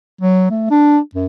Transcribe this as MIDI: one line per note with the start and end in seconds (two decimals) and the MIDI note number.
0.21 0.48 54
0.50 0.68 57
0.70 0.99 62
1.15 1.26 42